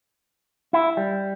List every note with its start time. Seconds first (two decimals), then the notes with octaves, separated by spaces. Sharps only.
0.73 E4
0.97 G3